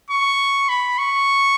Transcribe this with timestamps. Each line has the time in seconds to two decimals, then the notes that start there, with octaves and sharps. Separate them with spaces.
0.10 C#6
0.69 B5
0.98 C#6